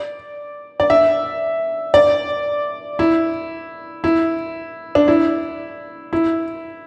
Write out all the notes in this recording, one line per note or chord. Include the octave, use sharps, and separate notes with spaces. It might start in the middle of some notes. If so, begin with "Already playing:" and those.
Already playing: D5
D5
E5
D5
E4
E4
D4
E4
E4